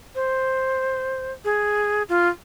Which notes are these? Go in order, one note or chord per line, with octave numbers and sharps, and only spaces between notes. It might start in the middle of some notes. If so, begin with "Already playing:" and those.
C5
G#4
F4